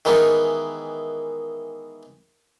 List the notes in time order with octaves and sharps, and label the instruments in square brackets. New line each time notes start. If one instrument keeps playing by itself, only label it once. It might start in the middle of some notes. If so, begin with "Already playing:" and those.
[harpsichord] D#3 E3 G#3 B3